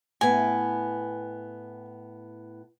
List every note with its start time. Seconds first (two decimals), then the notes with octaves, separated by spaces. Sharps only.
0.21 A2 B3 G#5